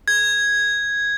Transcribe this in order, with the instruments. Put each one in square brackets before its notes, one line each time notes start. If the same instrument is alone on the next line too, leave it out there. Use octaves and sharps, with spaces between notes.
[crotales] G#6